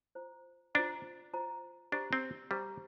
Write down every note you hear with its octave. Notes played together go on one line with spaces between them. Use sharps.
F4 C5 A#5
D4 F4 C5 A#5
F4 C5 A#5
D4 G4 C5 A#5
C4
G3 G4 C5 A#5